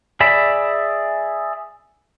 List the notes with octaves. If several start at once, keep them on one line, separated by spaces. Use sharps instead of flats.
G#4 D5 E5 B5